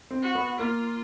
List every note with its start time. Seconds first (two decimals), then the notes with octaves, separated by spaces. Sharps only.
0.11 C4
0.22 F#4
0.35 B3
0.59 A#3 F4